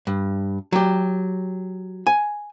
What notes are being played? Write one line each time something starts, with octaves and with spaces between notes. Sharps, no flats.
G2
F#3 G4
G#5